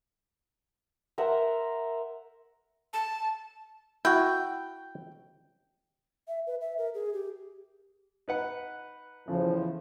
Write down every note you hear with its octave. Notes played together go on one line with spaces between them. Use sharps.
A#4 C5 E5 F#5
A5
E4 F#4 G5
E5
B4
E5
A#4
G#4
G4
D#4 B4 F#5
E2 A2 C#3 F3